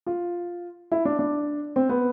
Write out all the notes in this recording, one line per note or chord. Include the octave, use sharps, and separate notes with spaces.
F4
E4
D4
D4
C4
B3